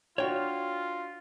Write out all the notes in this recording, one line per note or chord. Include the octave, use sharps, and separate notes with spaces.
D4 F4 F#4 C#5 G5